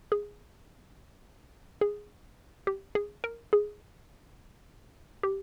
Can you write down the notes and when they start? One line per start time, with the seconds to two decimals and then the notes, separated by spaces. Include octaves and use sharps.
0.12 G#4
1.81 G#4
2.67 G4
2.95 G#4
3.24 A#4
3.53 G#4
5.23 G4